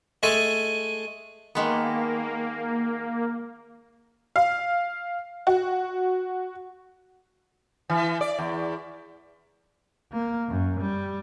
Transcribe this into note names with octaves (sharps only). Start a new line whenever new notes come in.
G#3 A3 A4 G#5
D#3 G#3 A#3 B3
F5
F#4
E3
D5
E2
A#3
F#2
G3